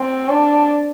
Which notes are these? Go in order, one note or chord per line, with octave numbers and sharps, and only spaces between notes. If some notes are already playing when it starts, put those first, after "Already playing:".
Already playing: C4
D4